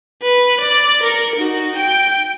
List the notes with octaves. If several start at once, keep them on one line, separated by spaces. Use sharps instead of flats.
B4
D5
A#4 C#7
D#4 F#4
G5 D7